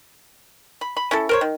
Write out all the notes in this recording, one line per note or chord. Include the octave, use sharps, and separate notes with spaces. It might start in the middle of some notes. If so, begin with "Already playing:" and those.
B5
B5
C#4 E4 A4
A#4 C5 C#5
D#3